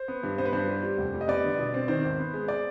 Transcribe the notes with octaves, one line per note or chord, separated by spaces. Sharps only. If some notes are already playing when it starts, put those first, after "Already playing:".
Already playing: C5
B3
G2
B3 C5
B4
G2 C5
G3
G3
F1
G3
D#5
B3 D5
D3
B2
C4
D#3 C5
G#1
B3
G#3
D5